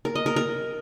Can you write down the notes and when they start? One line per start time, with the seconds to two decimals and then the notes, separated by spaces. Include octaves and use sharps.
0.05 A#4
0.15 D#5
0.26 A#4
0.36 A#4